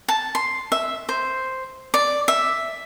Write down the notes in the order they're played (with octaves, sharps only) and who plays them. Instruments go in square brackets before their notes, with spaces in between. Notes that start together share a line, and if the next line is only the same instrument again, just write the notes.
[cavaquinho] A5
C6
E5
C5
D5
E5